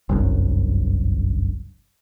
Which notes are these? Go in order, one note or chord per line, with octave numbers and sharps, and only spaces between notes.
G1 C2 F#2